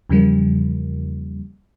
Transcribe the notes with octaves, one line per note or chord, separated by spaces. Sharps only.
E2 C#3 F3 G3 A#3